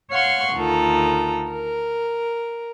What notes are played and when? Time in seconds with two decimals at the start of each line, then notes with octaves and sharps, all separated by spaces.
0.11 C#5 F5 F#5 C6 C#6
0.54 D2 D#3 F4 A4 A#5
1.51 A#4